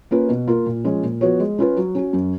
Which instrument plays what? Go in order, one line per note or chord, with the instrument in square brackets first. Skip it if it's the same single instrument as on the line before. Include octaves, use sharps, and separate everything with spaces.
[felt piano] A#3 C#4 F4 B4
B2
A#3 F4 A#4
A#2
F3 G#3 C#4
A#2
F3 B3 F#4 C#5
G#3
C#4 F4 B4
F#3
C#4 F#4
F#2